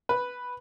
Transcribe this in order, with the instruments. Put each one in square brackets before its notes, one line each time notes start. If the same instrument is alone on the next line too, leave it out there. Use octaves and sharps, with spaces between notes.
[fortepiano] B4